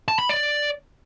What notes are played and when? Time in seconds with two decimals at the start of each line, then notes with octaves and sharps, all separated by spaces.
0.08 A5
0.19 B5
0.29 D5